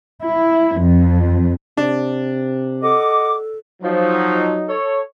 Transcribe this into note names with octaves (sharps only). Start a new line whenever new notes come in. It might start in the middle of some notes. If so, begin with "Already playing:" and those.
E4
F2
C3 D4
A4 D#5 F#5 D6
F3 F#3 D#4
A4 C#5